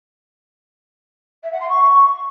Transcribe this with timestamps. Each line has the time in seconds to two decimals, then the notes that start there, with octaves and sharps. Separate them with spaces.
1.43 E5
1.52 F#5
1.60 C6
1.69 C#6